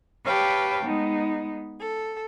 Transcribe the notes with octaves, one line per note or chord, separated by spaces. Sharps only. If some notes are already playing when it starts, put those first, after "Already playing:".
G4 B4 C#5 F5 G5 A5
G#3 B3 D#4
A4